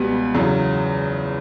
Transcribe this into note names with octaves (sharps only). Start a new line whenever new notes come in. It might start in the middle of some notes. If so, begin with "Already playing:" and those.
Already playing: C#2 B2 G3 B3
E2 C#3 F#3